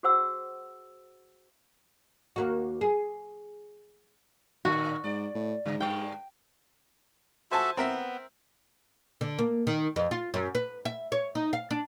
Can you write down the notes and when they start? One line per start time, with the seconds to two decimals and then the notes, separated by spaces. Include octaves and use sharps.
0.03 F#4 G#4 C5 F#5 E6
2.36 D#2 A#3 F#4
2.81 G#4
4.65 A2 D#3 F#4
5.04 G#2 D5
5.34 A2
5.65 G#2 C#3
5.80 G2 G3 G5
7.51 F#4 A4 C5 E5 G#5 A5
7.77 B3 C4 A#4 E5
9.21 D3
9.39 A#3
9.67 D#3
9.96 F2
10.11 F4
10.34 F#2
10.55 B4
10.85 E5
11.12 C#5
11.35 D#4
11.53 F5
11.71 D4